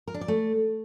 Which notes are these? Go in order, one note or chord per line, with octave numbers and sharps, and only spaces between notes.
A#4
D4
D5
A3